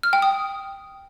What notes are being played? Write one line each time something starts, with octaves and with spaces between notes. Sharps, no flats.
F6
G5
D#6